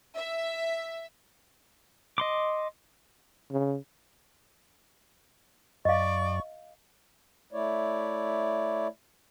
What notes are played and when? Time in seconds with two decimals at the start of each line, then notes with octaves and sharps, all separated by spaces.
0.17 E5
2.18 D#5 C6 D6
3.52 C#3
5.85 F#2 D5 D#5 F5 C#6
7.53 A3 E4 C#5 D5